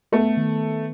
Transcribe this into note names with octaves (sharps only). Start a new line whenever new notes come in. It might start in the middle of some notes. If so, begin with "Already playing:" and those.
A3 B3
D#3
D#3